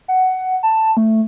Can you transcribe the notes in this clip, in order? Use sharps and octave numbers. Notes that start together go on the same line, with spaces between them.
F#5
A5
A3